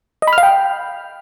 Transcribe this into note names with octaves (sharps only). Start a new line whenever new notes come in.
D#5
B5
F6
F5
G5